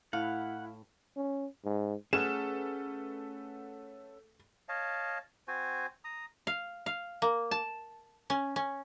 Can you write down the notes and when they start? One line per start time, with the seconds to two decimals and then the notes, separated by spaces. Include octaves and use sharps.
0.13 A2 E4 F5 F#5
1.17 C#4
1.65 G#2
2.13 A3 C#4 G#4 A4 B4 F#5 E7
4.69 C#5 D#5 F5 A5
5.48 C4 F#4 C5 G#5
6.04 A#5 D#6
6.47 F5
6.86 F5
7.22 A#3
7.51 A5
8.30 C#4
8.56 C#4